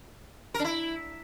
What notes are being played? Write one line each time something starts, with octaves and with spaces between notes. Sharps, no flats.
A#4
D4
E4